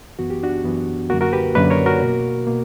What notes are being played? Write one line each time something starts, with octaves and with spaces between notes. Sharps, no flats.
F#2 E3 B3 F#4
G4
D4 F#4
F#2 E3 B3
F#2 D3 A#3 F#4 A#4
F#4 A#4
G4 B4
F#2 D3 A#3 B4 D5
A#4 C#5
F#4 A#4
B2 A#3
B2 A#3